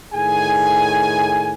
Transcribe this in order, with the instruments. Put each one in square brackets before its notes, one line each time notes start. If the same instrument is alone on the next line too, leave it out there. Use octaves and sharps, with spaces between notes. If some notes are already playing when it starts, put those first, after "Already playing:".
[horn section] A2 D#3 G#4 G#5